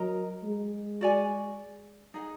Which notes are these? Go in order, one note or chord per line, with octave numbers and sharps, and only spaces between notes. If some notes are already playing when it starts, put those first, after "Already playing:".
Already playing: F#3 A#4 D#5 A#5
G#3
F#4 D5 G#5
D#4 G#4 D#5 F#5